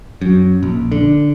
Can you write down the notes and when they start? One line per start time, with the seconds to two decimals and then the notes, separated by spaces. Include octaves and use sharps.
0.21 F#2
0.63 A#1
0.92 D3